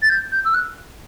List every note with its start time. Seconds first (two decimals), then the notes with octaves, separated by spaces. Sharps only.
0.02 A6
0.09 G6
0.32 G6
0.45 E6
0.53 F#6